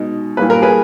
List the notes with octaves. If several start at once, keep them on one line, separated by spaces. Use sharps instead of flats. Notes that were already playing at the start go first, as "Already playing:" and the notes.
Already playing: B2 G#3 D#4
A#2 G3 A#3 B4
A#4
G#4 B4